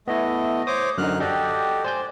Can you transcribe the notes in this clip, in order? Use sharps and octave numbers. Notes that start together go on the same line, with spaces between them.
A3 B3 E4 D#5
C5 C#5 D6 D#6
F#2 D3 D#4 F6 F#6
F#4 G4 A4 D5 D#5 G5
C5 D5 G#5 G6